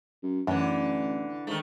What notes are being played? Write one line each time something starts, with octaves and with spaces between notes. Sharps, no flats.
F#2
A1 F#2 D3 E3
G#2 D#3 A3